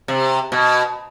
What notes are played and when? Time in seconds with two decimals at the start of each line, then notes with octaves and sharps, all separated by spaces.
0.08 C3
0.52 B2